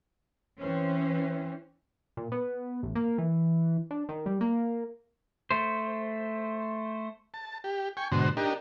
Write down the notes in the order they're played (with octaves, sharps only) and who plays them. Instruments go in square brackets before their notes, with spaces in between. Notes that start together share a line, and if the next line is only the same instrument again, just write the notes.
[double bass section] E3 C4 [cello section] C#4 C5
[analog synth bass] A#2
B3
A1
A#3
E3
D4
D#3
G3
A#3
[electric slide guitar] A3 C5
[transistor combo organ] A5
G4
G5 G#5 C#6
G#2 B2 D3 F#4 C5
D4 D#4 G4 A#4